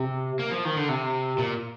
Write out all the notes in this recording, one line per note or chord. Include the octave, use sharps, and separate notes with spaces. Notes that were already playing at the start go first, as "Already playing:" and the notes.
Already playing: C3
A#3
F3
D#3
D3
C3
A#2